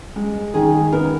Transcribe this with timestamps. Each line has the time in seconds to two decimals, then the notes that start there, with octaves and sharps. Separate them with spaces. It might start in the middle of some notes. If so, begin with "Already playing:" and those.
0.16 G#3
0.54 D#3 G#4
0.92 B3 A#4